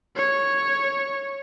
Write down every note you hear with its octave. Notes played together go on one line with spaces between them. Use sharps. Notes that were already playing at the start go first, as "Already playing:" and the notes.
C#5